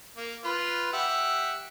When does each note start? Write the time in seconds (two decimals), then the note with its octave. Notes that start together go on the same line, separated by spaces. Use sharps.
0.17 A#3
0.44 F4 B4
0.93 G4 E5 F#5